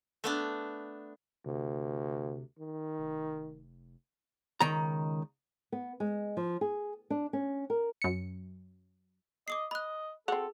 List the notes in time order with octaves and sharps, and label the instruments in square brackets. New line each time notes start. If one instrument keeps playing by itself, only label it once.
[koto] A3 B3 D4
[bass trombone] D2 [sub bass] C3
[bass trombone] D#3
[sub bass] F1
[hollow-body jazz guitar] C#2 D#3 A#5
[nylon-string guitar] B3
G#3
F3
G#4
D4
C#4
A#4
[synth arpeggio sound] F#2 C#7
[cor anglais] D#5 [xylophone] D6 D#6 C7
[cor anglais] D#5 [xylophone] B5 F#6
[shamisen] C4 F#4 [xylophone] G#4 [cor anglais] A4